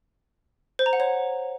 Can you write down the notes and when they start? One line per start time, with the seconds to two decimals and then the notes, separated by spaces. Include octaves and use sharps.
0.79 C5
0.86 A#5
0.93 F#5
1.00 C#5